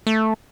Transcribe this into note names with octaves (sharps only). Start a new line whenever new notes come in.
A3